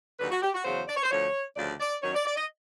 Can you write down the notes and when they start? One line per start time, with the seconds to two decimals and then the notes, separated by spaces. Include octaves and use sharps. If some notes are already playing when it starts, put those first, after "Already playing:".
0.19 D#2 D3 F#3 B4
0.31 F#4
0.41 G4
0.54 F#4
0.64 E2 C#3 F#3 C5
0.88 D5
0.96 C#5
1.03 C5
1.11 D2 D3 F3 C#5
1.56 D2 C#3 F3 D5
1.79 D5
2.02 F#2 D#3 F#3 C#5
2.14 D5
2.25 D5
2.36 D#5